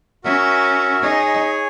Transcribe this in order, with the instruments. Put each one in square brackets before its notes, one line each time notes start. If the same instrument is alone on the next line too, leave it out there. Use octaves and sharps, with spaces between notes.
[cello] C#4 [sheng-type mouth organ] F#4 A#4 E5 G#5
[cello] D#4 [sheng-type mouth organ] G#4 C#5 G#5